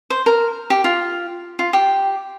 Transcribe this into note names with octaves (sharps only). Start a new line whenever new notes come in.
C5
A#4
G4
F4
F4
G4